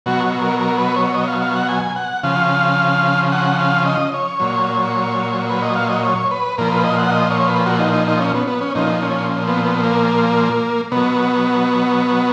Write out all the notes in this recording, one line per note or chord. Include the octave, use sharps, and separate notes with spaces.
B2 F#3 F#4
A#4
A#4
B4
C#5
D#5
F5
F5
F#5
G#5
F#5
C#3 F3 F5
F#5
F5
D#5
C#5
A#2 F#3
B4
D#5
F5
D#5
C#5
B4
A#2 F3 A#4
B4
D#5
F#5
D#5
C#5
B4
F#4
D#4
D#4
D#4
C#4
B3
B3
C#4
A#2 F3 D#4
C#4
B3
B3
A#3
B2 F#3 B3